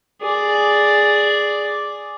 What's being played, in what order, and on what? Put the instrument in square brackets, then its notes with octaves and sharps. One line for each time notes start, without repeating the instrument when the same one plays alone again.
[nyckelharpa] G#4 D5